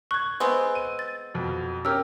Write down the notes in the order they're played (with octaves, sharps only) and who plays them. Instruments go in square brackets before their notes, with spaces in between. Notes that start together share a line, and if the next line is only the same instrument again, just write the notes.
[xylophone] C#6 [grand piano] F#6 G#6
[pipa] G#3 B3 C4
[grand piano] D#7
[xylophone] A6
[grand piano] F2 B2
[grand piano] C#4 G4 A#4 [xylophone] E6 F6